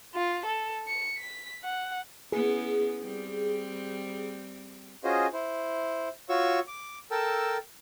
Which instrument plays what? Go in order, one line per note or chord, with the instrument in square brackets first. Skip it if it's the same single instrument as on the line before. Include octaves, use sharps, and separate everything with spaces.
[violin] F4
A4
C#7
B6
F#5
[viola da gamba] B3 C#4 E4 [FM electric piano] G#4
[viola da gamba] G3 C4
[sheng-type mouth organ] C#4 F4 F#4 G#4 C5 D#5
E4 C5
F4 F#4 C#5 C#6 E6
D6
A4 A#4 G5 A5 E6